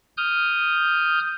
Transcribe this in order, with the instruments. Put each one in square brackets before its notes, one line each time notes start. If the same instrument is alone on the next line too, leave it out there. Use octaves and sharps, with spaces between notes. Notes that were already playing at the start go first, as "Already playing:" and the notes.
[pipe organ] D#6 F6 G6